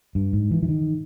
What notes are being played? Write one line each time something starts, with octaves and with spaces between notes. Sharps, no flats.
G2
G#2
E3
E3
D#3